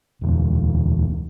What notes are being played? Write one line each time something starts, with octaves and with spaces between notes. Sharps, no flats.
D1 E2